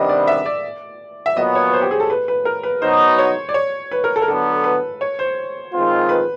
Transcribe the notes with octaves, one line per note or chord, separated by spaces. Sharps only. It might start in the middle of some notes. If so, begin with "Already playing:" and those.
Already playing: C3 D#3 G3 B3 D4 D#5
D5
E5
D5
E5
A#2 F#3 B3 D#5
C#5
B4
C5
G4
G#4
A4
B4
B4
A#4
B4
B2 F#3 B3 D#4 C5
C#5
D5
C#5
B4
A#4
A4
A#4
D3 F#3 B3 A4
B4
C#5
C5
D#3 G#3 C4 F4
B4